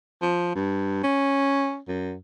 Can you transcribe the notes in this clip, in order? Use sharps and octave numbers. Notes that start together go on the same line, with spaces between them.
F3
G2
C#4
F#2